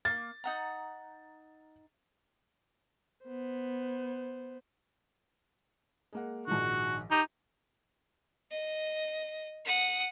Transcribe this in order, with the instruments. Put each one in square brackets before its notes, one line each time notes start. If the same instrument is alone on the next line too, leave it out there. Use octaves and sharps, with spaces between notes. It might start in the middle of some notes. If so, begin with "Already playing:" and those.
[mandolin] A#3 [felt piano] A6
[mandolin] D#4 F#5 A#5
[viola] B3 C5
[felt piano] G#3 A#3 F#5
[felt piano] A#1 G#2 D#3 [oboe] F#4
[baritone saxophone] D#4 [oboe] G4
[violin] D#5
F#5 D#6